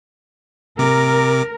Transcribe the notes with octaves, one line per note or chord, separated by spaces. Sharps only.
C3 A#4 D6